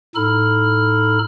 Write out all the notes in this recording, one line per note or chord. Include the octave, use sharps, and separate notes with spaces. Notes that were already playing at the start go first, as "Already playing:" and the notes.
A2 D#4 A4 B5 F6